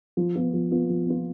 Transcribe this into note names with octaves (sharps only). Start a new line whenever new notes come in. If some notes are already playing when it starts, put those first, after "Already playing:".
F3
B3 F4
F3
B3 F4
F3
B3 F4